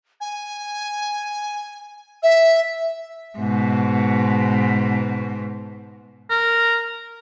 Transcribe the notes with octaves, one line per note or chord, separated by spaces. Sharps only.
G#5
E5
G#2 B2
A#4